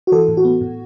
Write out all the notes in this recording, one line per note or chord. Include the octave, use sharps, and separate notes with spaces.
F#4
E3 A4
A2
F#4
B3
A2